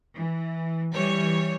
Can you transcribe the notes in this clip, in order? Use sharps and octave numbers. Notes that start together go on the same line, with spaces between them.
E3
E3 G3 C#5